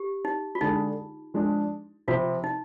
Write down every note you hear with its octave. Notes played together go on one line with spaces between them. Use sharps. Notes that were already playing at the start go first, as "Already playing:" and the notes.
Already playing: G4
D#4
F4
D3 G#3 D4 D#4 G#4
F3 G#3 D4
C3 F3 C4 F4
D#4